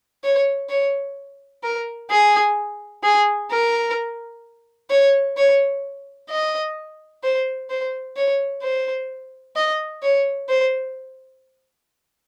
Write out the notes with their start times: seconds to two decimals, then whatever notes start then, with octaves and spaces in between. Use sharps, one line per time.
0.24 C#5
0.69 C#5
1.63 A#4
2.10 G#4
3.03 G#4
3.50 A#4
4.90 C#5
5.37 C#5
6.30 D#5
7.23 C5
7.70 C5
8.16 C#5
8.62 C5
9.56 D#5
10.02 C#5
10.49 C5